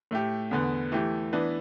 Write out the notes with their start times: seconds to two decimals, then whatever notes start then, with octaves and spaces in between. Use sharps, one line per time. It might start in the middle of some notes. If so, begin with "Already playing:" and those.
0.11 A2 A3 G4
0.51 E2 D3 B3
0.92 E3 A3 G4
1.33 E3 B3 D4